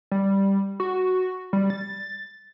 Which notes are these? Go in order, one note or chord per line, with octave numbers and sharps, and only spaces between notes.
G3
F#4
G3
A6